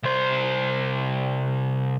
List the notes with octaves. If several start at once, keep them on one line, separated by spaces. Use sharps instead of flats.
C2 C5